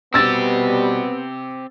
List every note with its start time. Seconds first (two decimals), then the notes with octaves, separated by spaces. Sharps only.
0.14 B2 G3 B3 C4 G4 E6 A6